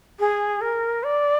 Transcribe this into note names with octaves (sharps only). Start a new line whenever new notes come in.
G#4
A#4
D5